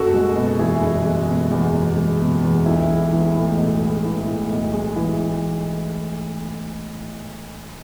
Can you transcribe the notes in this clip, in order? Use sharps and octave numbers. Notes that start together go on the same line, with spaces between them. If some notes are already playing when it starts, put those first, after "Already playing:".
Already playing: F#1 F#4 A4
G#3
B2
E2 E4 G#4
F#1
G#3
B2
E2
F#1
G#3
B2
E2
B1 E4
G#3
E3
A2
B1
G#3
E3
A2
B1
G#3
E3